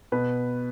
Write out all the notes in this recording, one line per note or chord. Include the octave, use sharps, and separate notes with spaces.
B2 B4